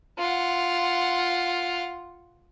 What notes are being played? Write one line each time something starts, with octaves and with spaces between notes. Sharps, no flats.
F4 F#5